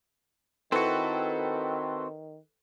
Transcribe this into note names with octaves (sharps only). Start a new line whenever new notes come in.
D#3 C4 E4 F#4 A4 B4